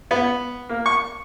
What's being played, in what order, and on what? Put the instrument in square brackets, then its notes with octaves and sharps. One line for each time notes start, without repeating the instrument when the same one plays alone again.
[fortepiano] B3
A#3
C#6